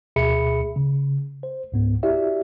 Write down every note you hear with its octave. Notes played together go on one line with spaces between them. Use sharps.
D2 B2 G#4 E5 B5 C#7
C#3
C5
C#2 G#2 B3
E4 F#4 G4 D5 E5